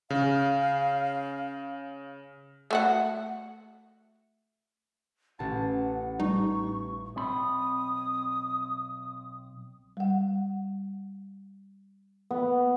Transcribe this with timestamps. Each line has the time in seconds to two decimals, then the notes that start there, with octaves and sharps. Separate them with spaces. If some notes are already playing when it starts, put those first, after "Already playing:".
0.10 C#3 F5
2.71 A3 F#4 F#5
5.39 A1 F#5 A5
6.20 A2 G3 D#4 C#6
7.16 B1 C4 B5 D#6
9.97 G3 F#5
12.31 B3